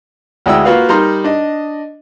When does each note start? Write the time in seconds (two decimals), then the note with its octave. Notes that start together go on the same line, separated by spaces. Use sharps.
0.46 D2 G#3 E4 D5 G5 E6
0.65 A#3 F4 F#4 B4 F5
0.89 G3 D#4 A#4 A#5 C6
1.24 D4 D#5